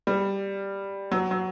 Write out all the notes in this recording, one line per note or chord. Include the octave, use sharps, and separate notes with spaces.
G3
F#3
F#3